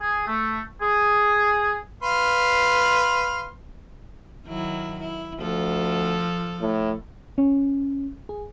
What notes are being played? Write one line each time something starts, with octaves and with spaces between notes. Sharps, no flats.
G#4
A3
G#4
B4 F5 C6
D#3 F#3 E4
E4
D2 F3 A4
A2
C#4
G#4